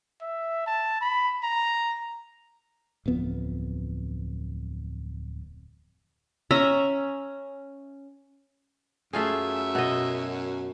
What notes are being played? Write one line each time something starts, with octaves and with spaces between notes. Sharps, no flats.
E5
A5
B5
A#5
D1 F2 B3
C#4 E5 A#5
F#2 A3 F4 G#4 E5
B2 D#5